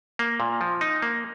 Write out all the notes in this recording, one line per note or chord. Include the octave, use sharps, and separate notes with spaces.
A#3
A#2
F3
D#4
A#3